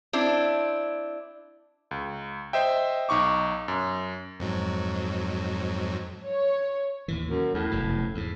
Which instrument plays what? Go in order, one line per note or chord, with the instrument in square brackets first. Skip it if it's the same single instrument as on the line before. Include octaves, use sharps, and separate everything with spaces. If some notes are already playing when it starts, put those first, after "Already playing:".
[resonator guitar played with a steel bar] C4 D4 E4
[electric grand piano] C#2
C5 D#5 E5 G5
B1 D#4 C#6 D6
F#2
[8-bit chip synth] F2 G#2 F#3
[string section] C#5
[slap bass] D#2 A2 E3
[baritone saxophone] F#2
[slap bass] E2 [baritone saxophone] A2
[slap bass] F1 F#2 B2
E2 G#2